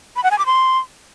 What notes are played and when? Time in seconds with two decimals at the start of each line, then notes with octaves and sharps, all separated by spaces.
0.16 B5
0.24 F#5
0.31 G#5
0.39 D6
0.46 C6